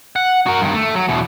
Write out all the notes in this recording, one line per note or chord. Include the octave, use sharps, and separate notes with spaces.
F#5
F#4 A#4
G2 D#3
A3
F#3
E2 B2